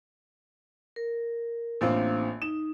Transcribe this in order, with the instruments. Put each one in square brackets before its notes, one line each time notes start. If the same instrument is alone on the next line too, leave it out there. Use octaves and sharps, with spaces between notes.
[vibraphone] A#4
[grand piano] A1 C4 F4 [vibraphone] A#3 D4
[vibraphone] D#4 [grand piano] E7